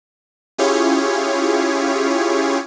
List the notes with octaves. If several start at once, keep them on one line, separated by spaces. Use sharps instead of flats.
C#4 E4 F4 G4 G#4 C#5